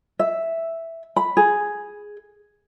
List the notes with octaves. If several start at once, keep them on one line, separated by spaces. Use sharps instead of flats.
E5
B5
G#4